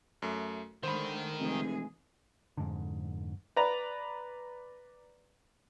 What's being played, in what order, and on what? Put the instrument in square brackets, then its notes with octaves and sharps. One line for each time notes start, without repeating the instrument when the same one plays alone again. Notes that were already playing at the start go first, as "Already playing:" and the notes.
[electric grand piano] F#2 A3
[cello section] G#2 D3 A3 [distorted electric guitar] D#3 [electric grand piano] C5 B5
[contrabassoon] F1 [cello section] E3 G#3 G#4
[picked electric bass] F2 G#2 D3
[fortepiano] B4 D5 A#5